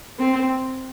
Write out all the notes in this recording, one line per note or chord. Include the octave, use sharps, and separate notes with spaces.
C4